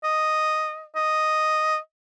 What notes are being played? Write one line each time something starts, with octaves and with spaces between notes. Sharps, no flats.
D#5
D#5